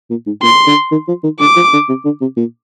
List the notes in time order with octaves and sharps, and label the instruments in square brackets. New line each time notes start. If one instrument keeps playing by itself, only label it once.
[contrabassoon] A#2
G#2
[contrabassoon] A#2 [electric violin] C6
[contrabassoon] D3
D#3
F3
D#3
[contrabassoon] D3 [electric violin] D6
[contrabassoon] F3
D3
C3
D3
C3
A#2